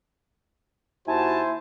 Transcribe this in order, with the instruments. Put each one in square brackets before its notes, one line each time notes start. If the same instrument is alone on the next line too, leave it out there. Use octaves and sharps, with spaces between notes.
[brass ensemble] D#2 F#4 A5 [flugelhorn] E4 [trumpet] C5 [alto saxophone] G#5